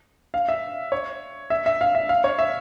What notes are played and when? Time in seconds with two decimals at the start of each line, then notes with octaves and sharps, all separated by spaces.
0.34 F5
0.49 E5
0.92 C#5
1.50 E5
1.66 E5
1.81 F5
1.95 E5
2.09 F5
2.24 C#5
2.39 E5